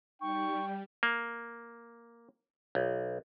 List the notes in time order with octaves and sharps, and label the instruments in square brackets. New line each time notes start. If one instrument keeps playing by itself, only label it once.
[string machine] G3 [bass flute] D#4 [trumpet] G5 [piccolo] C#6
[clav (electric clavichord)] A#3
B1